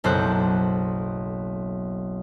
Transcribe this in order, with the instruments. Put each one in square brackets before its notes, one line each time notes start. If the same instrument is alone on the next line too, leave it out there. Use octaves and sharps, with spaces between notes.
[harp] F#1 B1 A4 C5 F#6